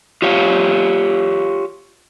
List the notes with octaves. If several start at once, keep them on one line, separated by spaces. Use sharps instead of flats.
F4 G4 C#5 F5